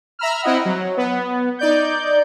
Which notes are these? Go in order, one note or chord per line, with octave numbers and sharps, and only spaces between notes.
E5 A#5 B5 E6 F6
C4 E4 D#5 F#5
F#3
B3
D#4 D5 G6